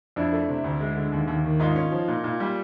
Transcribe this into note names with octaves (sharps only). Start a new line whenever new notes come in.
F2 D4 E4
A3
C3
D2
G#3
D3
D#2
D#2
D#3
G#2 D#4 F4
C#4
F3
A#2
A#2
G3